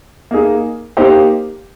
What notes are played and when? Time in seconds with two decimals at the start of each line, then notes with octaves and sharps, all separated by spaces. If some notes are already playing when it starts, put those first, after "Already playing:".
0.31 A#3 D#4 G#4
0.97 A#3 D#4 G4 C5